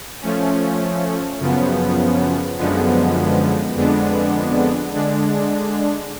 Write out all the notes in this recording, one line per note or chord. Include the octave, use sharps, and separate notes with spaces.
F3 A3 C#4
F#2 C#3 F3 B3
F#2 D3 F3 G#3 B3
F2 D3 G#3 B3 D4
D3 G#3 D4